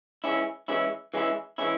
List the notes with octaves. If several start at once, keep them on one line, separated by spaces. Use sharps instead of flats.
E3 G#3 C#4 E4
E3 G#3 C#4 E4
E3 G#3 C#4 E4
E3 G#3 C#4 E4